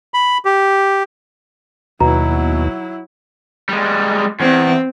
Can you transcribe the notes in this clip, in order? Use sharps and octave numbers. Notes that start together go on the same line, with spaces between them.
B5
G4
D#2 B2 F#3 E4 A#5
G3 G#3
E2 C4